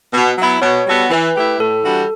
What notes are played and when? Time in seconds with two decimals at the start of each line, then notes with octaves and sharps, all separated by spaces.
0.13 B2
0.38 F#3 B3 E4
0.62 B2 C#5
0.87 G3 B3 F#4 A4
1.10 E3 B4
1.35 A3 E4 G4
1.59 A2 A4
1.84 E3 G3 D4 F#4